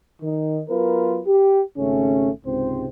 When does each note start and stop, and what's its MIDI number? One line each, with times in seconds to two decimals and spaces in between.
0.21 0.62 51
0.21 0.62 63
0.69 1.21 54
0.69 1.21 59
0.69 1.21 65
0.69 1.21 70
0.69 1.21 71
1.27 1.61 67
1.78 2.30 32
1.78 2.30 49
1.78 2.30 57
1.78 2.30 61
2.46 2.87 37
2.46 2.87 44
2.46 2.87 48
2.46 2.87 60
2.46 2.87 72